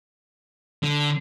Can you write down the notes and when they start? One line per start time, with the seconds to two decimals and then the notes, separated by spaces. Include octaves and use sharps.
0.83 D3